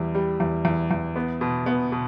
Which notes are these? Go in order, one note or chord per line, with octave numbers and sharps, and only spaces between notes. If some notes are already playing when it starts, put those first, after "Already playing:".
Already playing: E2 G3
G3
E2
E2
E2
B3
B2
B3
B2